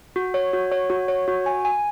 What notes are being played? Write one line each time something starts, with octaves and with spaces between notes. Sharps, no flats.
F#4
C#5
F#4
C#5
F#4
C#5
F#4
G#5
G#5